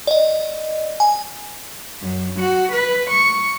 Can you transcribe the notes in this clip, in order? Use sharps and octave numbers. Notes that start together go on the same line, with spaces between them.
D5 D#5
G#5
F#2
F#4
B4
C#6